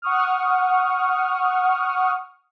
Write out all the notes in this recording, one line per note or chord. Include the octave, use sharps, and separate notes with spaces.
F#5 C#6 D#6 F6